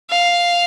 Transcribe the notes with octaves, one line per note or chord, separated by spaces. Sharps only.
F5